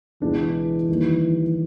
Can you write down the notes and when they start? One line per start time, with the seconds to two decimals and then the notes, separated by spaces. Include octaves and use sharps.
0.22 C#2 B2 E3 G#3 B3 D4
0.89 D#2 D#3 G3 A#3